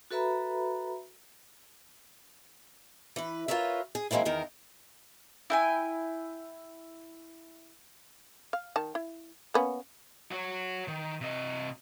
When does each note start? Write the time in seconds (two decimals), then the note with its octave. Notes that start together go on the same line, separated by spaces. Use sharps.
0.11 F#4 A4 B4 E5 A#5 B5
3.16 E3 B4
3.48 F4 A#4 B4 C#5 E5
3.95 G#4
4.11 E3 G#3 A#3 C4 E4
4.25 E2 D#3 A#4
5.50 E4 G5 G#5
8.53 F5
8.76 D#3 A5
8.95 E4
9.54 A#3 B3 C#4
10.31 F#4 C#5
10.88 D#3
11.21 C3 D#5